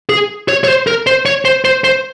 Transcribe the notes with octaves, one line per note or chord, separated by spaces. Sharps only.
G#4
C#5
C#5
C5
A#4
C5
C#5
C5
C5
C5